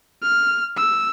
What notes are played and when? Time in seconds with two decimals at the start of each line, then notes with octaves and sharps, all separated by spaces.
0.22 F6
0.76 E6